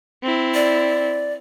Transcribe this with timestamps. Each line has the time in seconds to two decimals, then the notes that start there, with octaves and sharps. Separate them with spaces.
0.23 C4 E4
0.54 D5